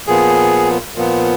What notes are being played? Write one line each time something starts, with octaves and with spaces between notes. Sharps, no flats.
A#2 F3 B3 G#4
A#2 F3 B3